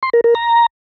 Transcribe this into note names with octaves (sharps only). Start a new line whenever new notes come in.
C6
A#4
A#4
A#5